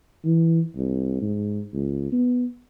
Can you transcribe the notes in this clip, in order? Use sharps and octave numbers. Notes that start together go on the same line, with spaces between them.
E3
C2
G#2
C#2
B3